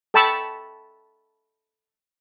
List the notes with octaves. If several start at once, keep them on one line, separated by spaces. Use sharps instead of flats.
A4 G5 A5 B5 C#6 E6